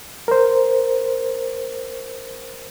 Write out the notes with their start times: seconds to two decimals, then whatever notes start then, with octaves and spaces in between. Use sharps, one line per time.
0.28 A#4 C5